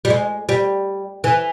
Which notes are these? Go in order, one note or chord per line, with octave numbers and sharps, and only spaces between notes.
G3
G#3
G3
E3